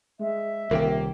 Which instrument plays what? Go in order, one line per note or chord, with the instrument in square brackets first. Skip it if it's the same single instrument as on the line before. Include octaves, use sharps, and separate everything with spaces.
[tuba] G#3 [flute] E5
[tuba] D#1 [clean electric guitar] C2 D#3 G4 [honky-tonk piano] A#3